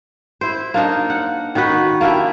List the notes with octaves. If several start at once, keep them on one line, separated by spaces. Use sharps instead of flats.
E4 C5
A#3 D4 D#4
F#5
D#3 D#4 F#4 B4
A#3 D4 E4 G4